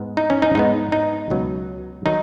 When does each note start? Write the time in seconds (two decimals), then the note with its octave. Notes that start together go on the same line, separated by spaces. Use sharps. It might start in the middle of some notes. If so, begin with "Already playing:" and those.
Already playing: G#2 G#3 B3
0.17 D#4
0.30 C#4
0.42 D#4
0.55 G#2 G#3 B3 D#4
0.92 D#4
1.30 C#2 B2 F#3 B3
2.06 D#3 F#3 D#4